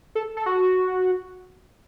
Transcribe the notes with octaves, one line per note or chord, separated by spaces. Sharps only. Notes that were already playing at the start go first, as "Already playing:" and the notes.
A4
A4
F#4